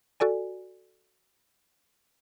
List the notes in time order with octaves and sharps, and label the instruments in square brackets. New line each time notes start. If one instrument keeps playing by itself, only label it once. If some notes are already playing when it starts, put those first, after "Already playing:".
[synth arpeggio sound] F#4 A4 D5 G#5